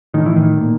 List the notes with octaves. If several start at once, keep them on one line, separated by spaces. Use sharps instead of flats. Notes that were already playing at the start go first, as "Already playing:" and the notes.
A2 D#3
E3
D#3
A#2